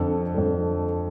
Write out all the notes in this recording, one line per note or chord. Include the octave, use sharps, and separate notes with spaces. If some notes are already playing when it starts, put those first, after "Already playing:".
Already playing: F2 D3 A4
F2 D3